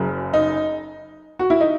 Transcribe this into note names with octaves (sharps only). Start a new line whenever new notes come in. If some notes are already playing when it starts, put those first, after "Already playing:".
Already playing: F#1 F#2 C#3
D#4
F#4
E4
D#4